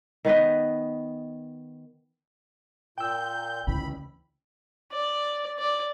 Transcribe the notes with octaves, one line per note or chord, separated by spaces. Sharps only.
D#3 B3 B4 D#5
A#2 G5 E6 G6
D2 C#3 E3 D#4 B5
D5
D5